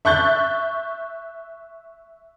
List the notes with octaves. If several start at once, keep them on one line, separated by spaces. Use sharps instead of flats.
E5 C#6 F#6 G6 A6